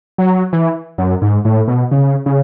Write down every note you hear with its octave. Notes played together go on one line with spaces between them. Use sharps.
F#3
E3
F#2
G#2
A2
B2
C#3
C#3